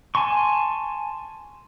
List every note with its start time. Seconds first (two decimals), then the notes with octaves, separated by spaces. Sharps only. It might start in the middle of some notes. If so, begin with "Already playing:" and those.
0.15 G#5 A5 C6 C#6